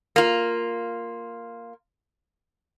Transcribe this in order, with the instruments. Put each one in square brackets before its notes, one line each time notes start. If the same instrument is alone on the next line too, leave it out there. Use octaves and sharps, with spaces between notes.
[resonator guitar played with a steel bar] A#3 F4